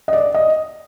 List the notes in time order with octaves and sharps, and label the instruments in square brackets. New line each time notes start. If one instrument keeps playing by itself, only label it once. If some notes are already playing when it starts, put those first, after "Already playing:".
[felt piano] D#5
D5
D#5